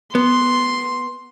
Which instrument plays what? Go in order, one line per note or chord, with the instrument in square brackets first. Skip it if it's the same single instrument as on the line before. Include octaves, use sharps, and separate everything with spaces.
[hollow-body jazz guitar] B3 [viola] C6